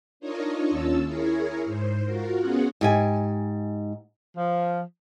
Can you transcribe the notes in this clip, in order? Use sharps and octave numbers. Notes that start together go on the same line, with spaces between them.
D4 D#4 F4 A#4 C#5 D#5
D#2 C#4 F4 A5 E6
E4 G#4 A#4 C#5
G#2 C5
F4 F#4 A#4
B3 C#4 F4 F#4 G#4 F#5
G#2 G4 G#5
F3